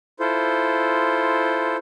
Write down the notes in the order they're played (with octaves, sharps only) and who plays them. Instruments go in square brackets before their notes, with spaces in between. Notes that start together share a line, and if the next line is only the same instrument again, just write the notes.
[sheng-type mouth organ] E4 F4 A4 C5